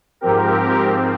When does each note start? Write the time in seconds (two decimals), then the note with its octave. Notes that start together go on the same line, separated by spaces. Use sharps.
0.21 G#2 F3 C4 G4 A#4